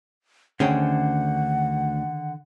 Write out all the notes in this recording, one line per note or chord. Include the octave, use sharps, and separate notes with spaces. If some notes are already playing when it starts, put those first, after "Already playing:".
D2 D3 D#3 C#4 G#4 C5 F#5 G5